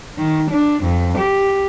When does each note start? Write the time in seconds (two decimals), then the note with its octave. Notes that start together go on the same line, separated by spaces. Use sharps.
0.18 D#3
0.51 D4
0.84 F2
1.17 G4